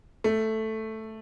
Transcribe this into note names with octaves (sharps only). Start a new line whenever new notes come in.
A3